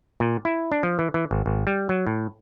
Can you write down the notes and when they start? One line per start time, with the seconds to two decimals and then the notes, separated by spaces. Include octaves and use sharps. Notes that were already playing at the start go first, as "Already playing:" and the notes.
0.20 A#2
0.45 E4
0.72 D4
0.83 F3
0.99 E3
1.14 E3
1.31 G#1
1.46 G#1
1.67 G3
1.89 F#3
2.07 A2